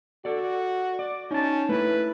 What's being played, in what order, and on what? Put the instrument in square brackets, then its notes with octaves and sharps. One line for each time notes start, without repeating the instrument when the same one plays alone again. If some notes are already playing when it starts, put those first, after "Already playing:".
[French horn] F#4 [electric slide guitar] A4 D5
[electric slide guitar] D5
[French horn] C#4 [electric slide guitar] D#4 A5
[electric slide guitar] A3 E4 [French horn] B4